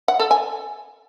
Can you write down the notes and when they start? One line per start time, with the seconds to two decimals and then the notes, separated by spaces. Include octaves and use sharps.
0.08 F#5
0.19 A4
0.31 G#5